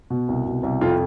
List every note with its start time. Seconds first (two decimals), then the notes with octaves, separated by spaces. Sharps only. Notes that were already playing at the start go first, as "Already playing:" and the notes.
0.10 B2
0.28 C2
0.46 B2
0.63 C2
0.81 F2 F4